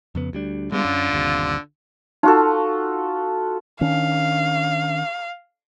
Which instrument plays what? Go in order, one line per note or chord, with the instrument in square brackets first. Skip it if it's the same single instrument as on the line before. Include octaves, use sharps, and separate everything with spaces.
[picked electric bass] F2 C#3 B3
D2 G3 D4
[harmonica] D3 F4 [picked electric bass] G3 G#3 B3
[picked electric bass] F#2 C#4
G1 D#2 C3
[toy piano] D#4 [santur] F4 F#4 A4
[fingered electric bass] D#3 C#4 D4 [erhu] F5